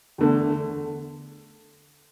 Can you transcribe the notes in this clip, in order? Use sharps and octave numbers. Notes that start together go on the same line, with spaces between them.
E2 D3 A3